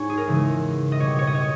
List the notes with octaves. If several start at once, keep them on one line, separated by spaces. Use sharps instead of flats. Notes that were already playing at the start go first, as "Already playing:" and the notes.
Already playing: G#2 C#5 G#5
G#4
A#4
E2 C#3 E3 G#3
D#5
B2 G3 C#5
C#5
D#5
C#5